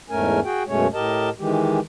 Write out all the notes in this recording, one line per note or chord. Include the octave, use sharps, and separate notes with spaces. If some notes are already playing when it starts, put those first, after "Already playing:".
E2 G#2 A3 C#4 A#4 G#5
F#4 G#4 G5
F#2 B2 G#3 A3 C#4 C#5
A2 G4 A#4 D#5 A5
D#3 E3 G#3 G4